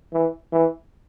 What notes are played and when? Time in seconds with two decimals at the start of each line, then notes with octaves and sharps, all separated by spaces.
0.13 E3
0.52 E3